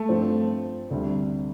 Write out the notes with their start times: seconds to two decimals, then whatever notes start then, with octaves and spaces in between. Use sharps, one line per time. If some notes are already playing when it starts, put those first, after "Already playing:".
Already playing: A3
0.09 G2 F3 C4
0.90 D2 C3 G3 D4